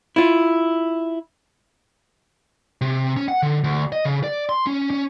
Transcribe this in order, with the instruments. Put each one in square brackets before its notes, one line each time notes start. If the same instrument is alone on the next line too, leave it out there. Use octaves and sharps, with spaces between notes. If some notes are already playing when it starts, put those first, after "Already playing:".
[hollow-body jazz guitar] E4 F4
[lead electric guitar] C3
C#4
F#5
D3
D2
D#5
C#3
D5
C6
C#4
C#4